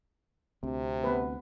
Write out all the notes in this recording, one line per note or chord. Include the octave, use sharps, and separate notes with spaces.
D2 C3 C4
B3 B4